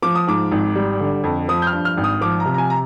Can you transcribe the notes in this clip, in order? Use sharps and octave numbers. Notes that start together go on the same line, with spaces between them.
F3 D6
D#6
G#2 D6
G#1
G3
D3
F2
F3 D#6
G6
F6
G2
F6
G#1
D#6
F3 D6
A#5
C3
A#5
G#5
A#5